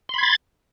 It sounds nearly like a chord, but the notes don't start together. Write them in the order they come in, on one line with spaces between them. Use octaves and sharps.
C6 B5 G#6 A6